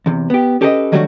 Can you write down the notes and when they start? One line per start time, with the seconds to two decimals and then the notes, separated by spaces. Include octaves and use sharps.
0.06 E2 C3
0.30 B3 G4
0.61 C#4 G4 A4 B4 C5 D#5
0.92 D#3 F#3 G3 A3 D4 F#4